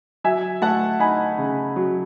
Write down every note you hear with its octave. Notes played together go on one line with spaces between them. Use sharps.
F#3 E5 G#5
A3 F#5 A5
D#4 G#5 B5
C#3
F#3